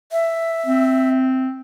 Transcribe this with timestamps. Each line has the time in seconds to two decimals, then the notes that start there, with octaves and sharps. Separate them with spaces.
0.12 E5
0.66 C4